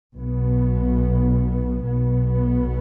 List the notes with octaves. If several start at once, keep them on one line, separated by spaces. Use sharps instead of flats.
B1 B2 B3
B1 B2 B3